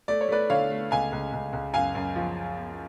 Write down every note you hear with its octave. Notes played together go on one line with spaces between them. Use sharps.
A3 D5
C#5
A3 B4 D5
D3 C#5 F5
A3
C#2 F5 G#5
C#2
C#2
C#2
F#2 F5 G#5
F#2
F3